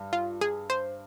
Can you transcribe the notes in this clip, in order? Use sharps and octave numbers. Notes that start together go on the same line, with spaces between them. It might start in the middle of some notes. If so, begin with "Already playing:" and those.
Already playing: G2
F4
G#4
C5